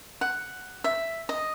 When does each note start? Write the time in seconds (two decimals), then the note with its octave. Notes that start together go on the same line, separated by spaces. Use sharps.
0.21 F#5
0.84 E5
1.29 D#5